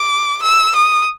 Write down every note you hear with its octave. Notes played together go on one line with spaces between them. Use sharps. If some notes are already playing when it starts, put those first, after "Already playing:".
Already playing: D6
E6
D#6